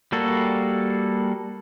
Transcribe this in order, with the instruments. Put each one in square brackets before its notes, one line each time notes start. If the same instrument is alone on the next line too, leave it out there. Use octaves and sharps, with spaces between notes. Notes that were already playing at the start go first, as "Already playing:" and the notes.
[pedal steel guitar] G3 A#3 F#4 A4